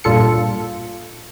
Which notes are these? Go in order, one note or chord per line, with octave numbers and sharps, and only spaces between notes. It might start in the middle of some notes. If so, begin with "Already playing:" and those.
G2 A#2 F4 A4 C#7